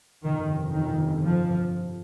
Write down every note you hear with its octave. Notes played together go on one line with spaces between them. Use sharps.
G1 F2 C3 D#3
D#3
F3